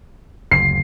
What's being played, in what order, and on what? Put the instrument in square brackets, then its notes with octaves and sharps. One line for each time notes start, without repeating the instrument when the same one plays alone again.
[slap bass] F#1 D2 [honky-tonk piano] C7